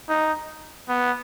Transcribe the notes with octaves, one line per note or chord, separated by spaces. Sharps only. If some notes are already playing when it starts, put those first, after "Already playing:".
D#4
B3